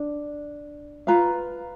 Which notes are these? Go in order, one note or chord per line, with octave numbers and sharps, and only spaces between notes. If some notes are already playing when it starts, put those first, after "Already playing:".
Already playing: D4
F4 B4 F5 A#5